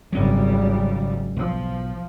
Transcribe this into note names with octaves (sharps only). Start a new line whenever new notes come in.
G#1 C#3 F#3 G3 C#4
B1 F3